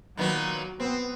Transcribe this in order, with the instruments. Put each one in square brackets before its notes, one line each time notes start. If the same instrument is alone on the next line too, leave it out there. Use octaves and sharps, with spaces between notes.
[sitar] A#2 D#3 B3 [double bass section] F#3
[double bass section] B3 [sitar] C4